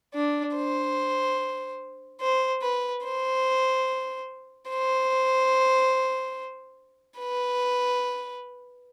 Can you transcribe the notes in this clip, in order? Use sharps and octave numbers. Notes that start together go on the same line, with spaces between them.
D4
C5
C5
B4
C5
C5
B4